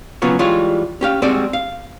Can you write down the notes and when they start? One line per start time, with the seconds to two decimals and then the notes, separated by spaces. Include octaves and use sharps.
0.22 C#3 F#3 B3 C#4 F4 C#5
0.39 E3 G3 G#3 F4 C#5
1.01 C#4 G4 F5
1.22 G3 G#3 C4 F#4 G#4 D5
1.53 F5